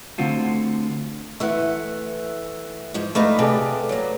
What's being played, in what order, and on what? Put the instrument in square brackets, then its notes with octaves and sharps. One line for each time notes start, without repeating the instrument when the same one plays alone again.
[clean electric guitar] D3 A3 C4 F4 F#4
[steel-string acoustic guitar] E3 A3 [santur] E5 F#5
[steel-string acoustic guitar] G#2 F3
[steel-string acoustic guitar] A3 B3 D#4 [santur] B4 D5 F5
[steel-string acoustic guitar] C3 [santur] G#4 A4 D5
[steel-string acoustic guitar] F#3 A#3